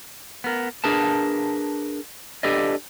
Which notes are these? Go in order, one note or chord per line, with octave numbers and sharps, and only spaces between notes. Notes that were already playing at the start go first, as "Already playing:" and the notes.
B3 A#4
D4 G#4 A#4 B4 A5
D4 G4 A4 B4 D5 D#5